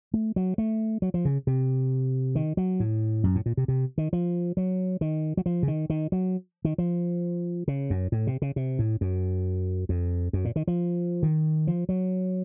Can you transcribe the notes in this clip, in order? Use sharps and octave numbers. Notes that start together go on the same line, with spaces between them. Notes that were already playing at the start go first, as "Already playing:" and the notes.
A3
F#3
A3
F#3
F3
C#3
C3
D#3
F#3
A2
F#2
A2
A#2
C3
C3
D#3
F3
F#3
D#3
F#3
F3
C#3
D#3
D#3
F#3
D#3
F3
C#3
F#2
A2
C3
C#3
C3
A2
F#2
F2
F#2
A#2
D#3
F3
D#3
F3
F#3